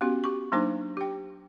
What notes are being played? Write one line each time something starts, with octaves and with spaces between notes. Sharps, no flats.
B3 C#4 F#4 G4
G4 C#6
F#3 A#3 D4 D#4 C5 D6
G4 G5